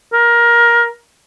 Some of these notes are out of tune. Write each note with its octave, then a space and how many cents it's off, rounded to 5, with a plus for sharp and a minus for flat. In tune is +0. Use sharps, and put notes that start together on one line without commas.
A#4 +20